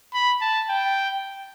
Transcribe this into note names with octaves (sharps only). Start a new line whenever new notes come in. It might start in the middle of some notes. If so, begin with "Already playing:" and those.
B5
A5
G5